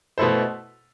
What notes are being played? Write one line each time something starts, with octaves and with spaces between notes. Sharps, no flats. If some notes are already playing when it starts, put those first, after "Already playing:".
B2 A3 E4 A4 C5